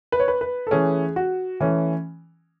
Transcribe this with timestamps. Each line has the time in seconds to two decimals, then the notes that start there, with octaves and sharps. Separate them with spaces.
0.12 B4
0.20 C#5
0.28 B4
0.41 B4
0.67 A4
0.71 E3 A3 C#4 G#4
1.16 F#4
1.60 E3 A3 C#4